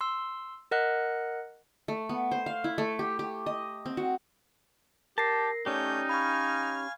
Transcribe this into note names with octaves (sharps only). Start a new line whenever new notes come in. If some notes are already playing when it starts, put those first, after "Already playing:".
C6 E6
A#4 D#5 F#5 F#6
A3
B3
C5
F5
E4
A3
G4
G4
D#5
C4
F#4
G4 A#4 A5 A#6 C7
A3 C#4 D#4 G4 C#5 D5 G6
F5 G#5 B5 C#6 F6